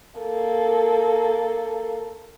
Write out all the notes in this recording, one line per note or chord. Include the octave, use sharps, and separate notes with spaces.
A#3 A4